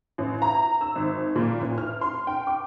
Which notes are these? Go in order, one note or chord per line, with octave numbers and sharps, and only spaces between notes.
A1
A#5
E6
G#1
A#2
A1
F6
C6
G5
D6